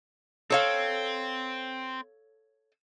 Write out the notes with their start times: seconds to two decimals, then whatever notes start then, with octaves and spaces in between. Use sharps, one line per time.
0.50 C4 A4 C#5 F5